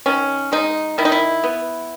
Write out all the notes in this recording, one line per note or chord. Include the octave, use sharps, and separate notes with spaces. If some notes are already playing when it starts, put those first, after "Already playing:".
D#3 C#4
G#3 D#4
D#3 E4
D#4
E4
B3